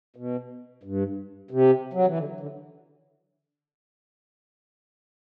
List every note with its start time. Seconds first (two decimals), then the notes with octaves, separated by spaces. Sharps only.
0.16 B2
0.83 G2
1.51 C3
1.93 F#3
2.06 E3
2.18 D3
2.40 D3